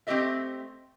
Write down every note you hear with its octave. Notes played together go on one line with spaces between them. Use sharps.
A3 C4 C#4 G4 D#5 E5